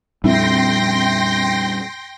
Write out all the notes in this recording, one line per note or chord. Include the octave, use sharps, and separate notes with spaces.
F2 A#2 G3 D4 E4 G5 C6 A#6